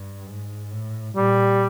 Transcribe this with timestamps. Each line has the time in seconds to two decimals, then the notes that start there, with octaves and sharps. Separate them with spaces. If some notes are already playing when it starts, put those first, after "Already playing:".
Already playing: G2
0.26 G#2
0.71 A2
1.15 A#2 G3